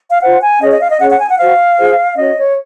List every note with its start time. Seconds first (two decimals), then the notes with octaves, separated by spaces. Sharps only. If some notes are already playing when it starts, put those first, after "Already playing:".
0.10 F5
0.21 F4 C5 F#5
0.41 G#5
0.61 C#4 G#4 C#5 D#5
0.71 D#5
0.81 F5
0.90 D#5
0.99 C#4 G#4 C#5 F#5
1.10 F#5
1.19 G#5
1.28 F#5
1.38 F#4 C5 F5
1.77 F4 G#4 C5
2.16 C#4 F#4 C#5 D#5
2.37 C#5